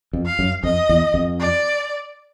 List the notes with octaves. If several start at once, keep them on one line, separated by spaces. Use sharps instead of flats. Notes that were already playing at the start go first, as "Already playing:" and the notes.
F2
F5
F#2
F2 D#5
E2
F2
D5